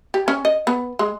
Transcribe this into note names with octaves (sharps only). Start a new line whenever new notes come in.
G4
C#4
D#5
B3
G#3